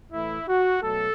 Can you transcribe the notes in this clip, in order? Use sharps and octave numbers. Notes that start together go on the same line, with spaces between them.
A2 E3 A3 E4
F#4
B2 F#3 A3 A4